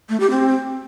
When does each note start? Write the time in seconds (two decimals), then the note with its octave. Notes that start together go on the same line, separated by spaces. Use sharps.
0.09 A3
0.20 G4
0.30 C4